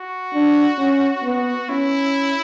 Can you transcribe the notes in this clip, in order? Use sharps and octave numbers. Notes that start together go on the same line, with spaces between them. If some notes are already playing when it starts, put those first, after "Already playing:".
Already playing: F#4
D4
C#4
B3
C#4 E4